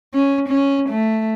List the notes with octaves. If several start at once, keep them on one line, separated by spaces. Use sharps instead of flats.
C#4
C#4
A3